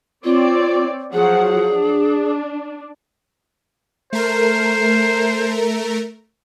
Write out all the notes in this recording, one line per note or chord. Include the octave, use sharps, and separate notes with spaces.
C4 F4 C#5 D5
F3 F#3 G#4 F#5
D4
A3 A#4 C5